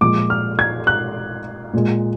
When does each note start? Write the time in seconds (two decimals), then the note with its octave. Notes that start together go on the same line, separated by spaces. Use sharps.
0.01 A#2 F3 G#3 D6
0.30 F6
0.59 G#6
0.87 F#6
1.73 A#2 G#3